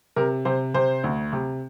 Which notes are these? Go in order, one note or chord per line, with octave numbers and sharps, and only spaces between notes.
C3 A#4
C3 C5
C3 C5
D2
C3